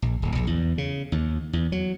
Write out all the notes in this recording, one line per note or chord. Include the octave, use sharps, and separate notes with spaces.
A#1
D1
A#1
E2
C#3
D#2
E2
F#3